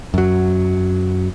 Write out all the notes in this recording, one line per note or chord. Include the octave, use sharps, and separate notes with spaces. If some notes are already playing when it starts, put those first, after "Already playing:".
F#2 F#3